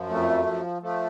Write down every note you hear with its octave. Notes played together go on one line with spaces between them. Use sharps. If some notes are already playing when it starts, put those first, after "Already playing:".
Already playing: F#2 F3
F2 A3
F3
F3 A3